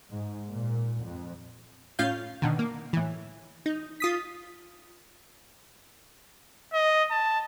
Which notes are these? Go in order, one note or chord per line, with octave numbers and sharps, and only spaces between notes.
G#2
A#2
F2
A2 C#4 F4 F5 G6
B2 D3 D#3
A#3
A2 E3
D#4
F4 D#6 B6
D#5
A5